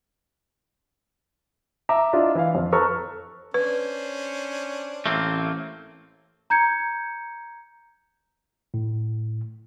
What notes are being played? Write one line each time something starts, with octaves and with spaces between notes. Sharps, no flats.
E5 A#5 D6
D4 E4 F4 D#5
E3 E4 E5 F5
F2
A4 B4 A#5 C#6 F6
C#4 D4 B4 C5
A1 A3 A#3 C4
A#5 G6 G#6 C#7
A2